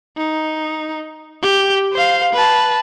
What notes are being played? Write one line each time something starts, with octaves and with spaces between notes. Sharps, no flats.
D#4
G4
C5 F5
B4 A5